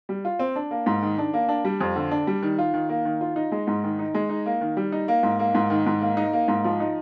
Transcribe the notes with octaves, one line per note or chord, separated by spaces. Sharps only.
G3
F4
C4
D4
A#3
G#2
D#3
D4
A#3
D4
G3
F2
D3
D4
G3
D#3
F4
D#3
A#3
D#3
F4
D#4
G#3
G#2
D#3
D#4
G#3
D#4
A#3
D#3
G3
D#4
A#3
G#2
A#3
G#2
D#3
G#2
A#3
D#4
A#3
G#2
F3
D#4